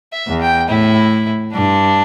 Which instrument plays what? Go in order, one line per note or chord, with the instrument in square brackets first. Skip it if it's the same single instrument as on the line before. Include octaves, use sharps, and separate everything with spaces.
[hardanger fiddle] E5
[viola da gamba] E2
[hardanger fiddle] G5
[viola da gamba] A2 [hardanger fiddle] E4
[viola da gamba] G2 [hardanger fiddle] D4